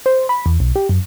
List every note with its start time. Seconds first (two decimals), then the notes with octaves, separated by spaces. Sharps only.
0.06 C5
0.29 B5
0.46 E2
0.60 B1
0.76 G4
0.89 F#2